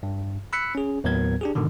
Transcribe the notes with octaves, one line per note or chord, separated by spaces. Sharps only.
G2
B5 E6 F#6 B6 C#7
C#4 G#4
D#2 A2 F#3 B3 A#4 G#6
D4 G4 G#4
G#2 B2 D3 D#3